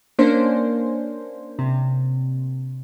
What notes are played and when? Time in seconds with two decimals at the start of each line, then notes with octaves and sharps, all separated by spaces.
0.19 A#3 C#4 D4 C5
1.59 C3